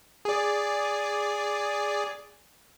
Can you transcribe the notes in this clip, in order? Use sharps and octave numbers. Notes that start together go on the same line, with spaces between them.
G#4 D5